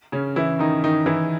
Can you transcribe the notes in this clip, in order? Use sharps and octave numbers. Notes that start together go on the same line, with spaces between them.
C#3 C#4
E3 E4
D#3 D#4
D#3 D#4
E3 E4